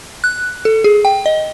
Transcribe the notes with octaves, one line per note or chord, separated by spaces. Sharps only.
F#6
A4
G#4
G5
D#5